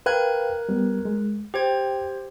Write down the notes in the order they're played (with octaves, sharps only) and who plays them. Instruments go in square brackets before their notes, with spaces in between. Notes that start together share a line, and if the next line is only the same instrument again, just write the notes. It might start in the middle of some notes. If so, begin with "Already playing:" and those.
[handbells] A#4 F#6 G#6 [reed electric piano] B4 F5 G5
[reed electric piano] G3 B3
G#3
[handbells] G4 C5 G#6 [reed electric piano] G5